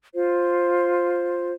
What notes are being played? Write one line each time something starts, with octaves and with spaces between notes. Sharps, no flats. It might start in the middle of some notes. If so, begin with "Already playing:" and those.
F4 C5